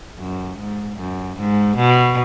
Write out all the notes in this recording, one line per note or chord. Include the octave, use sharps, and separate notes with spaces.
F#2
G#2
F#2
G#2
B2